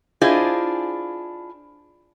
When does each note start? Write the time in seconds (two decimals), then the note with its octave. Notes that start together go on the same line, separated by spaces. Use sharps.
0.21 D4 E4 F4 G#4 C5 D#5